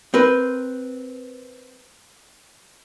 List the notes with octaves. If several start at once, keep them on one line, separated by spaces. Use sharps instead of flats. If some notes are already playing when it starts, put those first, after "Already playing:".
C4 A#4 B4